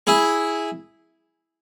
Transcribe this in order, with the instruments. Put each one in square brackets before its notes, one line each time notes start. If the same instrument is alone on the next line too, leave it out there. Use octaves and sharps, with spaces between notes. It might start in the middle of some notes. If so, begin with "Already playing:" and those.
[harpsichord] E4 G#4